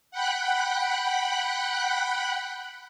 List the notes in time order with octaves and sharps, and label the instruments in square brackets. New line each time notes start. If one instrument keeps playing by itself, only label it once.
[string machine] F#5 G5 B5 F#6